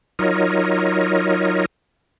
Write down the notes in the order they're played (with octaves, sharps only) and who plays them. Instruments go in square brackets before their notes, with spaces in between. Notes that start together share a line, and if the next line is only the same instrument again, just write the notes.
[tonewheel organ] F#3 D#4 F4 A#4 C#5 D#5